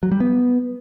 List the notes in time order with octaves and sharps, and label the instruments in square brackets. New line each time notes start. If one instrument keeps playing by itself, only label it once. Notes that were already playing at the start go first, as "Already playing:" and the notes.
[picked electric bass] F#3
G3
B3